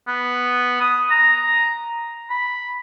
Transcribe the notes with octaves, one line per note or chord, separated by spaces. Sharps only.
B3
D#6
A#5
B5